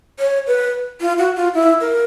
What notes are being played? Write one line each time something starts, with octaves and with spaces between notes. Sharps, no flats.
C#5
B4
F4
F#4
F4
E4
A#4